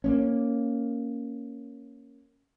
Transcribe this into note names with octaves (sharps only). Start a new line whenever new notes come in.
A#3 B3 C#4